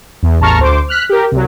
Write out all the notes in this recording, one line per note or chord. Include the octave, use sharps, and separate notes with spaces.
E2
A1 E2 A5 A#5 C#6 F6
D2 C5 D6
F6 F#6 B6
G4 A#4
C2 F#3